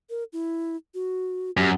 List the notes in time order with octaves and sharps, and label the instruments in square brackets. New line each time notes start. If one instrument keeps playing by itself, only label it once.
[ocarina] A#4
E4
F#4
[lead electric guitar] F#2 [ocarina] G4